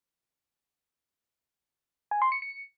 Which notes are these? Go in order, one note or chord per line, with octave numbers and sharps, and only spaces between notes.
G#5
C6
C#7
C#7